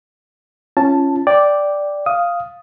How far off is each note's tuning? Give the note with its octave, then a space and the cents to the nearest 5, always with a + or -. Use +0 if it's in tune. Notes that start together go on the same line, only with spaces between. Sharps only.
C#4 +0 F4 -30 A5 +0
D5 +0 G5 +0
F5 -5 D#6 +5